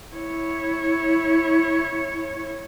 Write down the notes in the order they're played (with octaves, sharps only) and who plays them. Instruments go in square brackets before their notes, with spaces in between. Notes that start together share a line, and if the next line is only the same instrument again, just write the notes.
[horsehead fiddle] E4 C#5